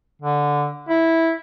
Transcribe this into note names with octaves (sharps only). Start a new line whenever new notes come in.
D3
E4